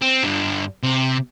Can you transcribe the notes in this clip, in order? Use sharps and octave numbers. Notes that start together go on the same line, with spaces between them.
C4
G2 D3
C3